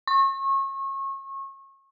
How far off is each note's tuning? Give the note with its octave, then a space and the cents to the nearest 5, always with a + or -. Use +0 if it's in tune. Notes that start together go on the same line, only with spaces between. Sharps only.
C#6 -30